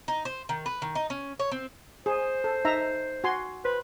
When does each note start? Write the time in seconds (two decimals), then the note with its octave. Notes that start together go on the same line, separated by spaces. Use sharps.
0.08 D#4
0.25 C5
0.49 D#3
0.66 B4
0.82 D#3
0.95 D#4
1.10 C#4
1.39 C#5
1.51 C4
2.06 G#4 C5
2.44 A4
2.65 D#4 E5 A#5
3.24 F#4 G#5 C6
3.65 B4 C5